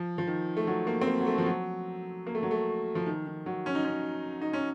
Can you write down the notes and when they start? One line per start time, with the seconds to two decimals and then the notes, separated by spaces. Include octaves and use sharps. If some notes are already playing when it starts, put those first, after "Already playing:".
Already playing: F3
0.18 F3
0.27 D#3
0.57 A3
0.67 F#3
0.87 A#3
1.01 C4
1.07 A#3
1.20 F#3
1.27 A3
1.38 F3
1.46 F#3
2.27 A#3
2.35 A3
2.43 F#3
2.51 A3
2.95 F3
3.06 D#3
3.26 D#3
3.46 F#3
3.66 C#4
3.75 D#4
3.85 C#4
4.42 D#4
4.53 C#4